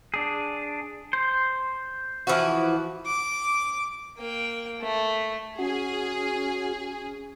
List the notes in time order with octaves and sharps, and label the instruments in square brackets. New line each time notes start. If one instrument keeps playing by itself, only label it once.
[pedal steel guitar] D4 G#4
C5
[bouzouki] E3 F3 F#4
[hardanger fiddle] D6
A#3 G5
A3
[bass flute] C#4 [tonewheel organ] F#4 [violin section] G#4